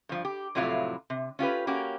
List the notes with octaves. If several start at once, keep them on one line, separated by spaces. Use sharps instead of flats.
G2 F3
G4
F2 A2 C3 F#3 E4 F4
C3
C#4 F4 G4 B4
A#3 C#4 F#4 G4